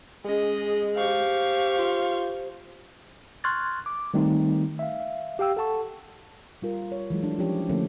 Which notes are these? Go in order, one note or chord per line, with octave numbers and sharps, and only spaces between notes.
G#3 C#4 G#4 D#5
G4 C5 F5 C#6
F4
C6 C#6 F6 F#6 G#6 A6
D6
D#3 G3 A3 C4 D#4
E5 F5
G4 F5 G5 E6
A4 F#5 A5 C#6
G3 F4 A#4
C#5
E3 F#3 G#3
D4
F3 C#4 E4 G4 C#5
D3 F3 A3 A#3 C#4